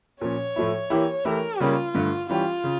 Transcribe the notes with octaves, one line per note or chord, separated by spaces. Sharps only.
A#2 F3 C#4 C#5
A2 F3 A3 E4
E3 A#3 E4 G4
E3 A3 E4 G4 A#4
C#3 G3 A#3 C#4 F4
G2 D3 A3
E3 G3 C#4 F4 G4
C#3